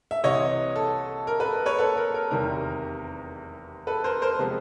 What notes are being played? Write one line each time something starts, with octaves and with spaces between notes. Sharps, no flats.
E5
C2 C3 E3 C#5 D#5
A4
A#4
A4 B4
B4 C#5
A4 B4
A#4
A#4
F1 E2 C3 D#3 G3 A#4
A4 B4
A#4 C5
A#4 C5
C3 F3 G#3 B3